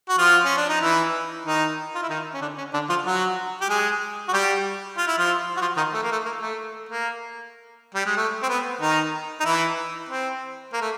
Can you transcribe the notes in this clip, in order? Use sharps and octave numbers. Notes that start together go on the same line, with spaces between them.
F#4
F3 F4
C#4
D4
D#4
E3 E4
D#3 D#4
F4
E4
D#3 D#4
C#4
D3 D4
C#4
D3 D4
F3 F4
F#3 F#4
G4
G#3 G#4
F#4
G3 G4
F4
E4
F3 F4
F#4
F3 F4
D#3 D#4
A3
A#3
A3
A#3
A3
A#3
G3
G#3
A3
C4
B3
D#3 D#4
D#4
E3 E4
C4
A#3
A3